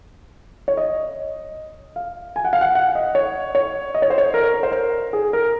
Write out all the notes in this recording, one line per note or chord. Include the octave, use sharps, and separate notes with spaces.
C#5
D#5
F5
G#5
F#5
F5
F#5
F#5
D#5
C#5
C#5
D#5
C#5
C5
C#5
A#4
A#4
C5
A#4
G#4
A#4